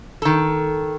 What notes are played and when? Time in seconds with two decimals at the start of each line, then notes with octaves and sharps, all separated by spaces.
0.22 D#3 A4